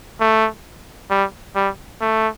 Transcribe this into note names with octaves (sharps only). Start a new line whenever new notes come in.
A3
G3
G3
A3